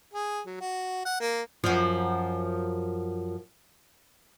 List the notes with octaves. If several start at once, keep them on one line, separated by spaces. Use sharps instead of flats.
G#4
F#3
F#4
F#5
A#3
F#2 F3